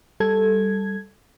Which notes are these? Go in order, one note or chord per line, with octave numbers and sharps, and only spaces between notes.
G3 A4 G#6